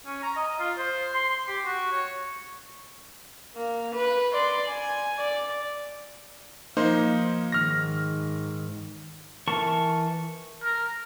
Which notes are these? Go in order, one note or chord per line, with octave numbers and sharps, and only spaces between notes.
C#4
A#5
D#5
F4
C5
C6
C6
G4
F#4
C#5
A#3
B4
D5 C6
G#5
D5
F3 A#3 D#4 C5
G#2 D#3 F6 A#6
E3 A#4 A5 C#6
A#4